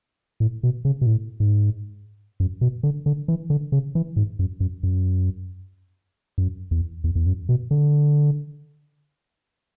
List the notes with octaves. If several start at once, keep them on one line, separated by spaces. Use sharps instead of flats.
A2
B2
C#3
B2
A2
G#2
F#2
B2
D3
D3
E3
D3
C#3
E3
G#2
F#2
F#2
F#2
F#2
E2
E2
E2
F#2
B2
D3